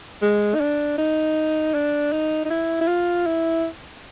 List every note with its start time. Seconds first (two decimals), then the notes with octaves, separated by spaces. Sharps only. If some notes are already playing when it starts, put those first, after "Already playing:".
0.22 G#3
0.54 D#4
0.60 D4
0.98 D#4
1.74 D4
2.12 D#4
2.45 D#4
2.50 E4
2.81 E4
2.88 F4
3.26 E4